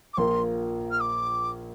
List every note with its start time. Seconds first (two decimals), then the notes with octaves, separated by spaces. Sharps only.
0.13 D6
0.17 A#1 A#2 A#3 F4 A#4 C6
0.91 F6
1.01 D6